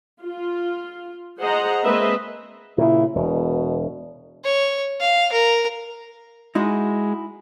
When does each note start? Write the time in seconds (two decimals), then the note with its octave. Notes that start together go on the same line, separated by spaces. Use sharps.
0.21 F4
1.40 G#4 C5 D#5 F#5 A#5
1.83 G#3 A#3 C4 B4 D#5 E5
2.78 A#2 C#3 E4
3.15 E1 B2
4.44 C#5
5.00 F5
5.32 A#4
6.55 G#3 D#4 E4 F#4